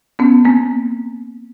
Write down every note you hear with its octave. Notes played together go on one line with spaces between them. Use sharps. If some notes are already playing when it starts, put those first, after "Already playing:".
B3 C#4
A#3 C4